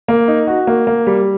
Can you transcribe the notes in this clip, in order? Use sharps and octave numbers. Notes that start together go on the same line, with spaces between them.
A#3
D#4
F#4
A#3
A#3
G3